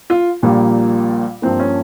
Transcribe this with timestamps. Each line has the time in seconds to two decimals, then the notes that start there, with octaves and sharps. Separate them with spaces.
0.10 F4
0.43 A#1 A#2 G3 A#3
1.42 G2 F3 A#3 C4
1.59 C#4